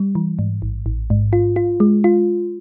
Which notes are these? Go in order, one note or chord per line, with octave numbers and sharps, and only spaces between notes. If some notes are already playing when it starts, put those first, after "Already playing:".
Already playing: G3
E3
G#2
A1
A1
G#2
F4
F4
G#3
F4